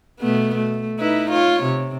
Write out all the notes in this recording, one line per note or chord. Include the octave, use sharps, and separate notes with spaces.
B2 A3 B3
A3
D#4 E4 B4
F4 C#5
C3